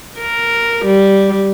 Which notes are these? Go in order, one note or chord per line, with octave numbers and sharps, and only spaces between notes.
A#4
G3